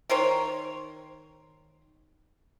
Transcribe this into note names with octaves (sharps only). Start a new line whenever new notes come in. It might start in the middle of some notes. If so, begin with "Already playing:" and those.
D#3 A#4 C5 C#5